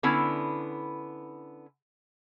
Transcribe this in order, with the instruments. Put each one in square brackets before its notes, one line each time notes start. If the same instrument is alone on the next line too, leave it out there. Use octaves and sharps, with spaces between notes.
[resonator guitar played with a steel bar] D3 B3 C#4 E4